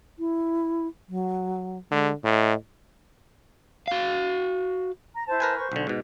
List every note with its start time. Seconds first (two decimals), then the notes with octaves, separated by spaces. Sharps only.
0.19 E4
1.09 F#3
1.91 D3 G#3
2.24 A2 D#5
3.88 F#4 F5
5.14 A#5
5.27 E4 C5 A5
5.40 A#4 B4 G#5
5.57 C5 C#6
5.72 B1 D3
5.87 G#2 B2